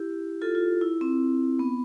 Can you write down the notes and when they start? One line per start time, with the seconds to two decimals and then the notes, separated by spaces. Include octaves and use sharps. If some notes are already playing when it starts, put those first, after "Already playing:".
Already playing: E4 G4
0.42 F4 A4
0.55 F4
0.81 E4
1.01 C4
1.59 B3